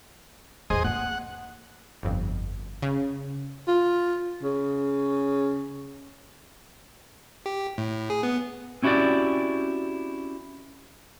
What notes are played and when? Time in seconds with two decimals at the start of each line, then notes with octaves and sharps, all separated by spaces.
0.70 A1 E2 G#4 C5 D#5
0.84 A#3 C4 F#5
2.03 G1 F2
2.82 C#3
3.68 F4
4.43 C#3
7.46 G4
7.78 A2
8.10 G#4
8.23 B3
8.82 C4 C#4 E4 F#4 G4 D5